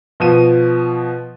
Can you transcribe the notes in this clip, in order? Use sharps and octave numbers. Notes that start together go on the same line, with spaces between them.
B2 F3 D#7